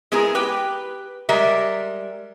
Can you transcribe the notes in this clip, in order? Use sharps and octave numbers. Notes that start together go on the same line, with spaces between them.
G#3 B3 E4 G#4 A#4
G4 B4 G5
G3 G#3 A#4 E5